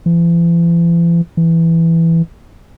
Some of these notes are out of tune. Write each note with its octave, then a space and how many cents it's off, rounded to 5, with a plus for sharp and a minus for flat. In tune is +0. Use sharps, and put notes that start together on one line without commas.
E3 +45
E3 +5